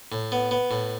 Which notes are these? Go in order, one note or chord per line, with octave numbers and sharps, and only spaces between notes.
A2
B3
B3
A2